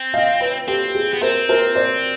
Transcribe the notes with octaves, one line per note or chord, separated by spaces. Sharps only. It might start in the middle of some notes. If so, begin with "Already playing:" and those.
Already playing: C4
D#5 F5
B4 C#5
C4 G4 A4
G#4
B3
C4 A#4 C5
A#4 C5
C5 D5